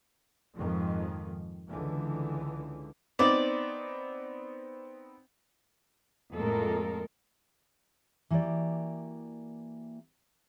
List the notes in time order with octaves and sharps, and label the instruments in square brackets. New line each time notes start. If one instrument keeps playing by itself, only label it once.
[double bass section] F2 G#2 D#3 F3
C#2 D3 E3
[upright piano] B3 C4 D#4 [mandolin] D5
[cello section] F2 A2 G#3 A#3 A4 A#4
[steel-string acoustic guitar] E3 A#3 F#4 G4 D5